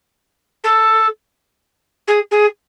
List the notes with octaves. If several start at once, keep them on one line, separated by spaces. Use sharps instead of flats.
A4
G#4
G#4